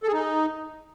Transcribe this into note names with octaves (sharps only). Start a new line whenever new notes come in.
A4
G#4
D#4